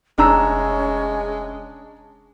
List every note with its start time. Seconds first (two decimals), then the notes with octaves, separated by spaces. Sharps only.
0.18 F1 G#3 C#4 D4 A#5 E6